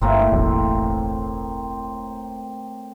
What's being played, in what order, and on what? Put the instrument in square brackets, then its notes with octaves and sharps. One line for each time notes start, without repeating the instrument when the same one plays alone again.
[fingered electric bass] G1 [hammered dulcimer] A2 A#3 C4
[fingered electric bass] E1 A1